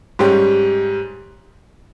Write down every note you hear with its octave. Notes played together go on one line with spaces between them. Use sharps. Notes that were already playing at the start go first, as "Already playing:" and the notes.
G#2 G3 C#4 G4